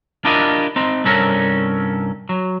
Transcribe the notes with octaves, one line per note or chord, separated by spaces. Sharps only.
D4 E4 F4 G4 A#4 D#5
C4 D#4
C2 G2 C4 C#4 A4 A#4
F#3